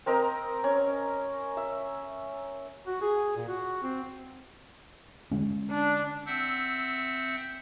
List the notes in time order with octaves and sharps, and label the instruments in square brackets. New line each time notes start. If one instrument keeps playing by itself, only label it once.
[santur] C4 A#4 D#5 A#5
C#4
E5
[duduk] F#4
G#4
A#2
F#4
C4
[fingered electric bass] D3 G#3 C#4
[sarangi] D4
[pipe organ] C4 E5 F#5 E6 G6